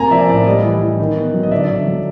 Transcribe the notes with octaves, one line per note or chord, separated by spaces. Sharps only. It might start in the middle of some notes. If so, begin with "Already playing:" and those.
Already playing: C3 A#3 G#5 A#5
F3 D5 E5
A2 D5
G3 D#5
E3
E3
D#3
B3
F#3
D#5
D3 D5 E5
D3
F#3